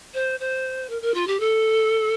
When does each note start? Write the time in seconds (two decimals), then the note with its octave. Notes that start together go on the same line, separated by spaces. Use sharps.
0.14 C5
0.39 C5
0.89 A#4
1.01 A#4
1.14 F4
1.27 G4
1.39 A4